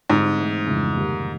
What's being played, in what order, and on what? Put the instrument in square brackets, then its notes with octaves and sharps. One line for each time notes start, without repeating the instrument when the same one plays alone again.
[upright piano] G#2 [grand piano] D3 G3 C4
[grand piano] E3 A3 C4
F2 C#3 E3 G#3
C3 D#3 G3 A#3